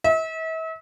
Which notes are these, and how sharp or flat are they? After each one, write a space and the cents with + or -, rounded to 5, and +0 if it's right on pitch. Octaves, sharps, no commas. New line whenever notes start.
E5 -40